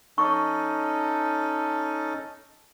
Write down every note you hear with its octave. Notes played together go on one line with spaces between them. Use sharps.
C#4 D#4 A4 C#6